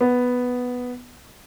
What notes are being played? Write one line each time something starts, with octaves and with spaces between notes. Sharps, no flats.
B3